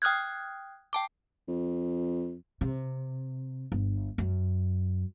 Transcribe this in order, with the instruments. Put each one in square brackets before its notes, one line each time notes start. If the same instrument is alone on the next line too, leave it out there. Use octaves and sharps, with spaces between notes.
[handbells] G5 D#6 F6 F#6 G#6
G5 A5 D6
[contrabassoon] F2
[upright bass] C3
G1
F#2